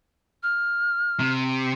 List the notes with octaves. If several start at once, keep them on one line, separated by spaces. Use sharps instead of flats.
F6
C3